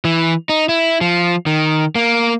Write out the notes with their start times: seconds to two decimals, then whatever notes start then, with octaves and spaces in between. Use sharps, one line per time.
0.05 E3
0.49 D#4
0.69 E4
1.01 F3
1.46 D#3
1.95 A#3